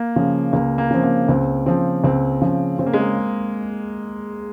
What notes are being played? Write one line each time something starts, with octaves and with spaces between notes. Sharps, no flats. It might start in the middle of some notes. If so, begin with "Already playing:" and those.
Already playing: A#3
C#3 F3
C#2 A#3
A#3
C#3 F3 C4
A#3
C#2 C4
C#3 F3 C4
C#2 C4
C#3 F3
C#3 C4
A#3
G#3
A#3